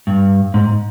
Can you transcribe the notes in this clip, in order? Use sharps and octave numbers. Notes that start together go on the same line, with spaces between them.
G2
G#2